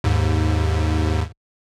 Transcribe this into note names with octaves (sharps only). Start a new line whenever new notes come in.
D#2 G#2